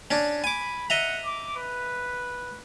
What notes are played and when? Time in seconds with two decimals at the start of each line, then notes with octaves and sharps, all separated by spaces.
0.11 C#4 D4
0.44 G#5 B5 D6
0.90 D#5 E5 F#5 A#5
1.25 D6
1.57 B4